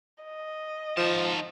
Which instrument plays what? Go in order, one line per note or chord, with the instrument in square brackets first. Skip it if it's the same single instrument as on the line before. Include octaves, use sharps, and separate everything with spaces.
[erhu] D#5
[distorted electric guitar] D#3 A5 [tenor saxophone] F3